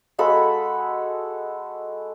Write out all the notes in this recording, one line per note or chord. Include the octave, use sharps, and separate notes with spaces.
G#3 F#4 A4 B5